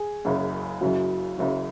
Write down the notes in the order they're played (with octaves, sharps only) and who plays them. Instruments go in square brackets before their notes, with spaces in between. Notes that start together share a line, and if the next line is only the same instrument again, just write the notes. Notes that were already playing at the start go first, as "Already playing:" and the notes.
Already playing: [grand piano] G#4
[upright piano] F#1 F#2 C#3
[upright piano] F#1 F#2 C#3 [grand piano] F#4
[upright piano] F#1 F#2 C#3